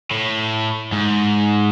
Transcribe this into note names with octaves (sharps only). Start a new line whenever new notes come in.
A2
G#2